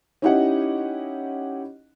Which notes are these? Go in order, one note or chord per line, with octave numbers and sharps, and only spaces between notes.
C#4 D#4 E4 G4 D#5 F#5